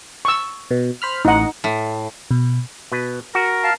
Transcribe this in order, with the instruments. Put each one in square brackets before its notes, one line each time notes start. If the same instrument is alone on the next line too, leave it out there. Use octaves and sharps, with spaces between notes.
[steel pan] C#6 E6
[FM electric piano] B2
C5 B5 F6
[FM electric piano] A1 D#5 [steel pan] D#4 F#5
[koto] A2
[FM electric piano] B2
[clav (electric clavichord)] B2 B4
[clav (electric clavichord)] F#4 [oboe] A#4
[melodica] F5 A5